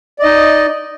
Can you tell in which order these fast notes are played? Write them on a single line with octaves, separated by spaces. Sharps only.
D5 D#5 D#4